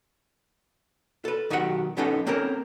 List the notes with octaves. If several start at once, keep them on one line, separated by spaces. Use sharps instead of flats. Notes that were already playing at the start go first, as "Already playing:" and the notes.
A4 B4
B1 D#3 F#4 G4 B4 F#5
B1 B3 C#4 D#4 A4 F#5
A#3 C4 C#4 A4 A#4